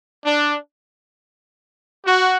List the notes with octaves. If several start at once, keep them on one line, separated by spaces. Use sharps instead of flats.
D4
F#4